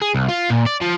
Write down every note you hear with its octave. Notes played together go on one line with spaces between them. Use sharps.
G#4
C2
F4
A#2
D5
F3